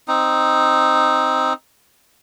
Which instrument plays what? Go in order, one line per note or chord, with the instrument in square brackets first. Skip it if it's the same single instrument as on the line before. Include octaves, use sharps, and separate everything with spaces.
[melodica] C4 D#4